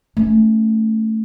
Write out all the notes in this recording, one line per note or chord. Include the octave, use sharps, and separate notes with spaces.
A3 C#4